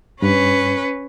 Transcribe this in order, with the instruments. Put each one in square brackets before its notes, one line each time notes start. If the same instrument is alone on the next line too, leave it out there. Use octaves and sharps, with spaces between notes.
[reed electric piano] G2 [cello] C#4 B4